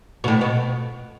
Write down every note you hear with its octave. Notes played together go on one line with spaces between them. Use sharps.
B2
A2
B2